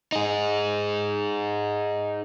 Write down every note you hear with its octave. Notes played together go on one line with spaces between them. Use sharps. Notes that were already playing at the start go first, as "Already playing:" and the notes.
D#4 G#4